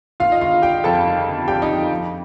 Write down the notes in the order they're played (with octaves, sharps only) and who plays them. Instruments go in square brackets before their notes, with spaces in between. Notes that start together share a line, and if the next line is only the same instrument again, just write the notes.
[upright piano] D#3 F4 F5
D#5
G1 F4 F5
G3 G4 G5
F2 A4 A5
D#3
G1
G3 G4 G5
D#4 D#5
F2
F3